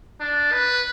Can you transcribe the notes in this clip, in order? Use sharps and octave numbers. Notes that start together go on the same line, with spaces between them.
D4
B4